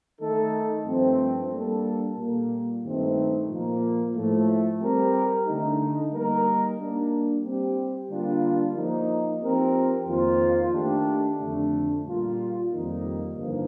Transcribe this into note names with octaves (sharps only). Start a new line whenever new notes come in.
D#3 A3 D#4 A4
G2 F3 A3 C4
G3 A#3 D4 A4
A#2 G3 A#3
G2 D#3 A3 C4 D#4
A#2 F3 A#3
A2 F3 A3
G3 C4 G4 A#4
D3 A3 D#4
G3 A#3 D#4 A#4
G3 A#3 D4
G3 C4 G4
D3 G3 A#3 D4 F4
F3 A#3 D#4
F3 C4 G4 A#4
F2 D#3 A#3 F4 C5
D#3 A3 D4 G4
F2 D3 A3 D4
A#2 G3 A#3 F4
F2 D#3 G3 A#3 D#4
G2 D3 F3 A#3 D#4